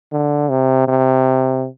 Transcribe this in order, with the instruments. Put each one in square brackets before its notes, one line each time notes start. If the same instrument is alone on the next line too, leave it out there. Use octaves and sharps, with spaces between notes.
[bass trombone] D3
C3
C3